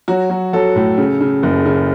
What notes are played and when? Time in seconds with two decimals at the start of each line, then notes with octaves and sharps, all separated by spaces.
0.08 F#3 F#4
0.30 F#3
0.53 F#3 A4
0.76 A2
0.98 C#3
1.21 C#3
1.43 F#1
1.66 C#3